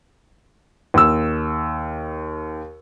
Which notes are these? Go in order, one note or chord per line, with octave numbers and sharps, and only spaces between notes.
D#2 E6